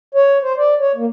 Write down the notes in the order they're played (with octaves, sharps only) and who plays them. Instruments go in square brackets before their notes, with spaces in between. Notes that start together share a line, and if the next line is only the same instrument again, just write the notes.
[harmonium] C#5
C5
D5
C#5
A#3